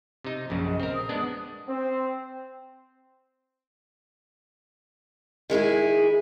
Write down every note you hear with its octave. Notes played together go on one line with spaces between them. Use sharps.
C3 D#4
A#1 F#2 C#3
D#5
C4 A#4 D#5
D#6
G#3 B3 D4
C4
D#3 G#3 E4 G#4